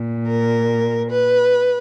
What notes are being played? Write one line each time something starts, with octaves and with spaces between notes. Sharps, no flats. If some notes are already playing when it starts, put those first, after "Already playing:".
Already playing: A#2
A#4
B4